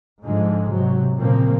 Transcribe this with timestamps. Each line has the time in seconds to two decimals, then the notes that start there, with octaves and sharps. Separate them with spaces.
0.24 G#2 D3 F3 G#3
0.71 C3 F#3
1.16 A#2 C#3 F3 A#3 C4